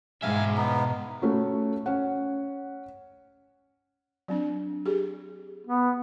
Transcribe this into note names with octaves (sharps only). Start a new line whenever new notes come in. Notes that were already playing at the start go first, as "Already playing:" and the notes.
G#2 B2 E5 F5 G#5
B3 D#4
A3 C#4 F#4
C#4 F#5
F#3 C4 D4
G4 G#4
B3